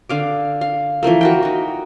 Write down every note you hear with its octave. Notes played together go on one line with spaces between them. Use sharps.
D3 F5 D6
F5
E3 F3 A3 A#3
F#4 A#4 G5
D#4 F#4